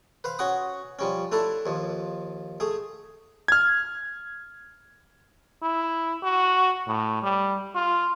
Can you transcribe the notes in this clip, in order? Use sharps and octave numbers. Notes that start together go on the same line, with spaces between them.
B4 C5 F5
C#4 F#4 F#5 D#6
F3 G3 C#4
A3 D4 E4 A4
D#2 F3
A3 G#4
F6 G#6
E4
F#4
A2
G3
F4